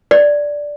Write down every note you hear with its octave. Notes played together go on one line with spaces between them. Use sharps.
D5